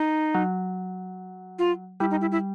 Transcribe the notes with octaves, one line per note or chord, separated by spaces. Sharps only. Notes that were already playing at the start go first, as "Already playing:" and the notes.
Already playing: D#4
F#3
F4
G3 E4
D#4
E4
E4